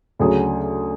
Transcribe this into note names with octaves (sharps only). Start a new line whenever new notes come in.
D2 C#3 F#3 C#4 G#4